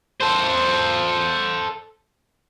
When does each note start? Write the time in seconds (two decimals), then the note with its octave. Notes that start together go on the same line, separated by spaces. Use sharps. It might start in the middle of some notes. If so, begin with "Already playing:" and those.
0.20 A4 C5